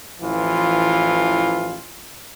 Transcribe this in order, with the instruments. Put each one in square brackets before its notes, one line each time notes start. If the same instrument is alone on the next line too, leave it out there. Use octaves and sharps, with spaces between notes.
[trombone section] A1 E3 F3 F4